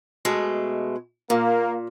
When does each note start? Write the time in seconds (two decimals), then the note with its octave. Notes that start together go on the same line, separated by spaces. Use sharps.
0.25 B2 G#3 A3
1.30 A#2 A#3